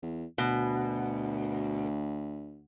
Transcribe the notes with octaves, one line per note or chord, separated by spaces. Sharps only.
E2
D2 B2